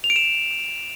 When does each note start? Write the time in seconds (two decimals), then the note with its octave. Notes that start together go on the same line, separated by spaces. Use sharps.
0.04 F7
0.10 D7
0.16 E7